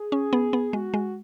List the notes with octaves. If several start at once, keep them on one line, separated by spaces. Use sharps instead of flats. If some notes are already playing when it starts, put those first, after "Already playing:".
Already playing: G#4
C#4
B3
B3
G#3 F#4
G#3